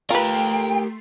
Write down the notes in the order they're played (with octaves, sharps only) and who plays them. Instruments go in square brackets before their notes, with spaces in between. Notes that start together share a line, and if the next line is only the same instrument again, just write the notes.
[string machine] A3 C6 [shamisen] F4 B4 [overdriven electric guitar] G4 A#4 [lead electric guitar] G5